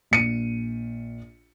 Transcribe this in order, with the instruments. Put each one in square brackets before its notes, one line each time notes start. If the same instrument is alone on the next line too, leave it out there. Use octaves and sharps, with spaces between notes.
[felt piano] A#1 C#7 D#7